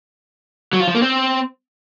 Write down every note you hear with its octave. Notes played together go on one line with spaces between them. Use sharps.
F#3
F4
F3
A#3
C4